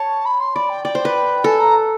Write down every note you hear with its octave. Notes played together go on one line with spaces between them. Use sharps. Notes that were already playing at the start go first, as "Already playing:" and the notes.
Already playing: C#5 A5
B5
C6
D5 B5
G5
D5 G5
C5
B4
A4 G#5
A#5